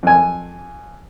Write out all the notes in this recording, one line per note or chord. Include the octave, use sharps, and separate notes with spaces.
F2 G#5